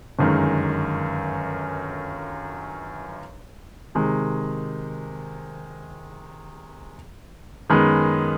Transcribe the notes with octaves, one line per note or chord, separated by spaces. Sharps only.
G1 F#2 D#3 G#3
C3 D#3 G#3
F#2 D#3 G#3 B3